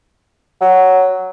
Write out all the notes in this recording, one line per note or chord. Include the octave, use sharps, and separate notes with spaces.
F#3